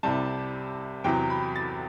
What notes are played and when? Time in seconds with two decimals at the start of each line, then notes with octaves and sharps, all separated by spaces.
0.03 C2 C3 G3 A5
1.04 E2 C3 F#3 G5
1.30 B5
1.56 A6